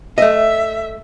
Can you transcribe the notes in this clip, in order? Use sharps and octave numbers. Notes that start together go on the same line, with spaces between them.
A3 D#5 E5